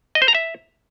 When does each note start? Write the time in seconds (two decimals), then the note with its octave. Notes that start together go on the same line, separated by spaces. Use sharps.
0.15 D#5
0.22 C5
0.28 A#5
0.35 E5